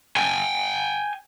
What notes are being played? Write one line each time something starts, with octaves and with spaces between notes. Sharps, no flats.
G5 G#5